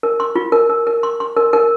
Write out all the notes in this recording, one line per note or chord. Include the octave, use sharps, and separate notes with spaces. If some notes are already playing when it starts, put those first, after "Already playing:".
A#4
C6
F4
A#4
A#4
A#4
C6
C6
A#4
A#4